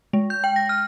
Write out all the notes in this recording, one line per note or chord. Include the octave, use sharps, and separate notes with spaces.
G#3
G6
G5
A#6
F6